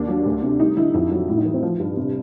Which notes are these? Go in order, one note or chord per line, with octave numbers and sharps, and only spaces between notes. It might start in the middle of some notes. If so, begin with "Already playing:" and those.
Already playing: D#2 D4
F#3
D2
C3
G3 D#4
D3 E4
F2 E4
F#3
A2 E4
D#4
E3
C4
F3
G2
C3